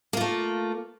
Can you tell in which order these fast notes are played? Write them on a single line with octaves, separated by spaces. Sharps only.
A#3 F4 A3